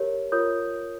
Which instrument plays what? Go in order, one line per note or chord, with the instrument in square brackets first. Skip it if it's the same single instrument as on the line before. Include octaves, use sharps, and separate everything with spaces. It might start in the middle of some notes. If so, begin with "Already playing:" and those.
Already playing: [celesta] G4 A#4 C#5
F4 A#4 C#5 D#6 G6